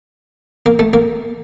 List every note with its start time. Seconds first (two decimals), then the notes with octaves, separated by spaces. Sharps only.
0.66 A#3
0.79 A3
0.93 A#3